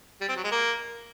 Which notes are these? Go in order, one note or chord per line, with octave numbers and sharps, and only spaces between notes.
G3
C4
F#3
G#3
A#3